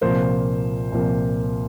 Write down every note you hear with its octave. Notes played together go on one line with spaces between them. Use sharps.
C2 A#2 F3 A#3 C5
C2 A#2 F3 A#3